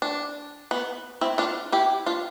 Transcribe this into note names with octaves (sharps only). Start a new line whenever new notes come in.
D4
B3
C4 E4
D4 F4
E4 G4
D4 F4